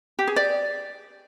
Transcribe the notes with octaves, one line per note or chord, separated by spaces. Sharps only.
G4
G#4
D5